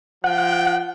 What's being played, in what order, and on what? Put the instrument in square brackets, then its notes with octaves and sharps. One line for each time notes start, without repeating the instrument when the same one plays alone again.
[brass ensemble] F3 G5 [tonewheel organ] F#5